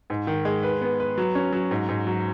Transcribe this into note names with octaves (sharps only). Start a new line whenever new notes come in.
G#2
D#3
G#3
B4
B3
B4
F#3
C#4
F#3
G#2
G#2
F#3